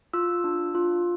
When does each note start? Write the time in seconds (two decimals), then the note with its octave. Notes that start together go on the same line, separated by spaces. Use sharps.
0.14 F4 E6
0.44 D4
0.75 F4